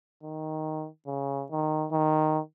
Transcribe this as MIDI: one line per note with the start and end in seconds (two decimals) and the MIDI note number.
0.23 0.88 51
1.07 1.45 49
1.51 1.87 51
1.92 2.40 51